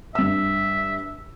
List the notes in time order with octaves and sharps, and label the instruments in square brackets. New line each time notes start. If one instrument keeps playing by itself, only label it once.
[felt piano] G2 E6 [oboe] E5